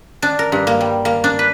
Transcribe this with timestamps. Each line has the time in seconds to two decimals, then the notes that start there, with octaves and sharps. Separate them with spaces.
0.22 D4
0.39 A#4
0.52 G2
0.67 A#3
0.81 G3
1.05 A#3
1.24 D4
1.39 B4